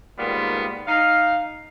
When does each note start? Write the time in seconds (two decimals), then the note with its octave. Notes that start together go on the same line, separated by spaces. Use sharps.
0.18 G#2 D#3 G3 A#3 B3 F4
0.87 D#4 F5